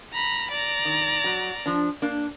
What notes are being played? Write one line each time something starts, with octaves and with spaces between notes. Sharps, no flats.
A#5 B5
D5 A#5
D#3
F#3 F#4
F3 D4
A#3 D4